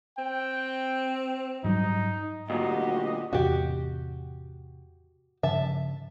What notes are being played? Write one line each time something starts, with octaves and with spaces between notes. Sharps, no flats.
C4 G5
G#2 F#3 G3 D#4
D2 A#2 F#4 G4 D#5
E2 A2 C3 F#4 G4
G2 C#3 F3 E5 A5